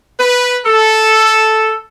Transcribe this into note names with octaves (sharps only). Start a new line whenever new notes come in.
B4
A4